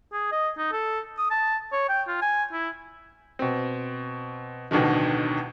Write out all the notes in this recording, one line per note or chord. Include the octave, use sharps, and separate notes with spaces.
G#4
D#5
D#4
A4
D#6
A5
C#5
G5
F4
G#5
E4
B2 C4
A1 D2 B2 D3 D#3